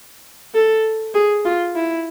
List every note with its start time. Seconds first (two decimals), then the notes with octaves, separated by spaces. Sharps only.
0.55 A4
1.14 G#4
1.45 F4
1.75 E4